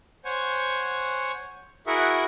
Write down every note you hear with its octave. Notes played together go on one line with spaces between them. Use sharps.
C5 C#5 F#5 G#5
E4 F#4 G#4 A#4 E5 F#5